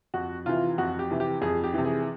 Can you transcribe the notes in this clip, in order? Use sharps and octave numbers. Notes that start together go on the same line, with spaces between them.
F2 F#4
C3 E3 F4
F2 F#4
G4
C3 E3
G4
F2 G#4
G4
C3 E3
G#4